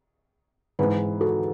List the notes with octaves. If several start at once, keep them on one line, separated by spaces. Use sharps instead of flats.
G#2 E3 G#3 G#4 B4
F#4 A4